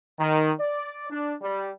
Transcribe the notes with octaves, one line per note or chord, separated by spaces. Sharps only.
D#3
D5
D4
G3